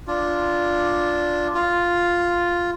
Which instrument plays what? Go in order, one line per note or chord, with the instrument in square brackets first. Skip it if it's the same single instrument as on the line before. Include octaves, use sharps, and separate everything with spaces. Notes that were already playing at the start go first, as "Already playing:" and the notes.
[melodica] D4 F4
F4